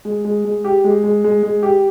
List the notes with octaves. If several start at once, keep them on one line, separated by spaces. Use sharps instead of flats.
G#3
G#3
G#3
G4
G#3
G#3
G#3
G#3
G4